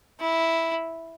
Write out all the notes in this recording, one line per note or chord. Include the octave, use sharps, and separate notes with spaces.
E4